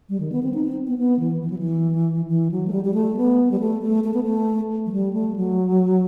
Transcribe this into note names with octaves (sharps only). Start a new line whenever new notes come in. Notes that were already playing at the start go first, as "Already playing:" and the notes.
G3
D#3
B3
C4
D#4
C4
B3
B3
E3
E3
F#3
E3
E3
F#3
A3
G3
G3
A3
B3
G3
A3
A3
A3
B3
A3
F#3
G3
A3
F#3